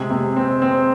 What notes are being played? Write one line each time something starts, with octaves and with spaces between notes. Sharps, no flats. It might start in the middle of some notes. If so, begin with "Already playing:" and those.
Already playing: C3 G#3
C3
C4
C4